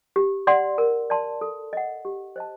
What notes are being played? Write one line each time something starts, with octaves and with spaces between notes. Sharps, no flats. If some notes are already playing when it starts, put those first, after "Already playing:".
G4
D5 F#5 C6
A#4
D5 A5 C6
A4
D#5 F#5
G4
C5 D#5 A5